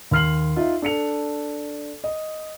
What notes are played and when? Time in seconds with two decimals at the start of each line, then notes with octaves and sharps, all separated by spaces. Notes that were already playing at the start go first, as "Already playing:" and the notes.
0.11 D#2 C6 F6 C7 F#7
0.56 D#4 F4 E5
0.82 D4 A4 C#7 F7
2.04 D#5